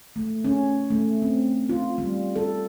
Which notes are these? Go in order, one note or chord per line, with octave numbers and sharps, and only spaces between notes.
A3
C#4
A3
C4
F4
G3
A4